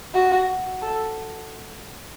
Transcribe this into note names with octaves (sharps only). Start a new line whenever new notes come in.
F#4
A4